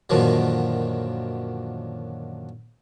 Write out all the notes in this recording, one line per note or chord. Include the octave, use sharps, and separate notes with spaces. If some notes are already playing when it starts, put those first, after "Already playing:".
F#2 A#2 D3 D#3 F3 F#3